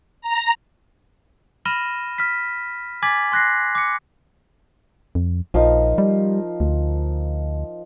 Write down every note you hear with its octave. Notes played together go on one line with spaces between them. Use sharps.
A#5
B5 F6 A#6 D#7 E7 G7
F6 B6
G#5 D6 G#6 A6 B6 F#7
C6 F#6 A#6 C7
D6 C#7
F2
A#1 F3 D#4 A#4
G3
D2